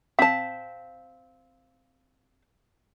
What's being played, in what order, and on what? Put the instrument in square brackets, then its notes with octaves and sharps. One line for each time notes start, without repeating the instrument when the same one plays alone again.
[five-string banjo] C4 A5 [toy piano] F5